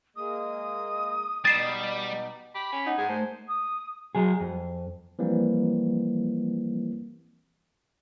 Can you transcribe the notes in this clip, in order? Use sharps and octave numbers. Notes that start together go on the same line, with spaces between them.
G#3 A#3 D#6
B2 G3 D#4 A6 C7 E7
G4 B5
C#4 G#5
D#4 F#5
G#2 G#4 G#5
A3 C5
D#6
F#3 G#4
F2
E3 F3 G3 A#3 C4